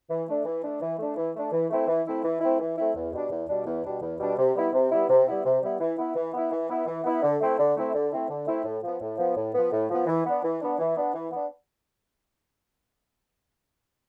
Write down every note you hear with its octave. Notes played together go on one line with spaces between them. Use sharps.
E3
A3 D4
E3
A3 D4
E3
A3 D4
E3
A3 D4
E3
A3 C4 E4
E3
A3 C4 E4
E3
A3 C4 E4
E3
A3 C4 E4
E2
B2 G3 D4
E2
B2 G3 D4
E2
B2 G3 D4
E2
B2 G3 D4
C3
G3 B3 E4
C3
G3 B3 E4
C3
G3 B3 E4
C3
G3 B3 E4
E3
B3 E4
E3
B3 E4
E3
B3 E4
E3
B3 E4
D3
A3 C4 E4
D3
A3 C4 E4
D3
A3 C4 E4
D3
A3 C4 E4
A2
F3 B3
A2
F3 B3
A2
F3 B3
A2
F3 B3
E3
B3 D4
E3
B3 D4
E3
B3 D4
E3
B3 D4